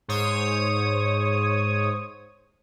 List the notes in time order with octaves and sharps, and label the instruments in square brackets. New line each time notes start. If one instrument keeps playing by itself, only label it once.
[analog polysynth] G#2 C5 C#5 D#6